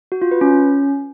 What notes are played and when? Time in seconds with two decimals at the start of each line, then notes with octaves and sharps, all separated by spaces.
0.12 F#4
0.22 F4
0.31 B4
0.41 C#4